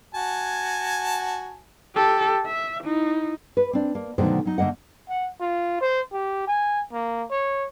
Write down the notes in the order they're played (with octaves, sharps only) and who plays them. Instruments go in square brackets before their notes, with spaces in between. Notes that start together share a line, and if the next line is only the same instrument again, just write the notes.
[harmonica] F#4 G#5 A5
[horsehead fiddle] G4 A4
E5
D#4 E4
[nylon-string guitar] B4
C4 D4
A#3
B2 D3 D#3 F#3 A3 C5
F#3 D#4
D3 A3 A#3 D#5 F#5
[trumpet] F#5
F4
C5
G4
G#5
A#3
C#5